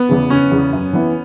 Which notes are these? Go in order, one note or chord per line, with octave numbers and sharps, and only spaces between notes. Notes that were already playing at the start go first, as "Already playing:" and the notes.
Already playing: B3
E2 C#3
F#1 C#4
E2 C#3
F#2
E3 B3 E4